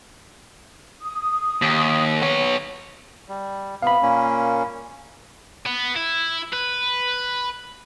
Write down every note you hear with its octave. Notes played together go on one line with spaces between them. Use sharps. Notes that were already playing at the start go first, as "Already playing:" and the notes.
D#6
D#2
B3 C#5
G3
C3 B3 F5 B5
A#2 A#3 C#4
B3
E4
B4